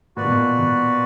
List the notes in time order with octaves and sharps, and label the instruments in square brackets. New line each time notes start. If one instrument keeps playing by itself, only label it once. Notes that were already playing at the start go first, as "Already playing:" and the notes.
[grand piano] A#2 [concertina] F#4 B4 D5
[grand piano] B2
A#2
B2